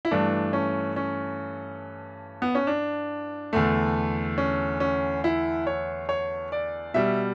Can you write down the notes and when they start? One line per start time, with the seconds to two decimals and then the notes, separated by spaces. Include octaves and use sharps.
0.05 E4
0.11 G2 E3 A3 D4
0.53 C#4
0.96 C#4
2.42 B3
2.55 C#4
2.67 D4
3.53 E2 D3 A3
4.38 C#4
4.80 C#4
5.24 E4
5.67 C#5
6.09 C#5
6.52 D5
6.94 B2 G3 E5